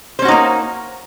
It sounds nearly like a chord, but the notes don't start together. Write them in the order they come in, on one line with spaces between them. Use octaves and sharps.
C5 C#4 F#4 D#4 A#3